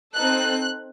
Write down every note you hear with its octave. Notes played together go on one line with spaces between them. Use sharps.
C4 D#4 A4 F#6